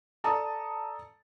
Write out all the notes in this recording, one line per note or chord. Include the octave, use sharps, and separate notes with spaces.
A4 D5 A5 A#5 D#6